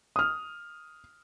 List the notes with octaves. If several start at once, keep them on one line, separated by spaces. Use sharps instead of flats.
D#6 F6